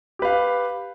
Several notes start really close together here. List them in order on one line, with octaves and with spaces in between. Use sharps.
G4 B4 F5